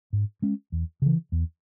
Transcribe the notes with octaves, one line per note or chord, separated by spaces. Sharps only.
G#2
G#3 C#4
E2
C#3 E3
E2